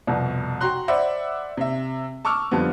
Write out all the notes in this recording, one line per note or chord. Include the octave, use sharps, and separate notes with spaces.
C2 F2 B2
F#4 G5 A#5 C6 F#6
C5 D5 E5 F#5 B5
C3 E5
A5 C#6 D6 E6 F6
F2 D3 F3 G3 B3